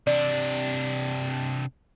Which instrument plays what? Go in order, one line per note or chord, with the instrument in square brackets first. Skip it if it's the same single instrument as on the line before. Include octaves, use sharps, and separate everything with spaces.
[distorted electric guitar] C3 D4 [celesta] D5